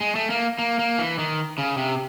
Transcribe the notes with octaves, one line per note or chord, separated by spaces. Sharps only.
G#3
A3
A#3
A#3
A#3
E3
D#3
C#3
C3